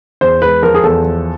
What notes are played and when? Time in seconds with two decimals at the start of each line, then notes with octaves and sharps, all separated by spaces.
0.21 E2 C5
0.42 G#3 B4
0.62 F3 A#4
0.74 G#4
0.84 E2 A4
1.05 F3